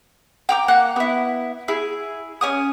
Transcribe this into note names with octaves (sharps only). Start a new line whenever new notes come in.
G5 A#5 D6
A#3 F#5
B3 E4
E4 G#4
C#4 G#5 D#6